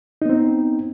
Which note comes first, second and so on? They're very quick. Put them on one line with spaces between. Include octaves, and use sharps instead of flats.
D#4 B3 C4